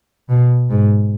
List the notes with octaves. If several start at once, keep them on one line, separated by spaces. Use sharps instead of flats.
B2
G#2